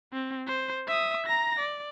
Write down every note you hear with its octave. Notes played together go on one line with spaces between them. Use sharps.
C4
C5
E5 D#6
A#5 A#6
D5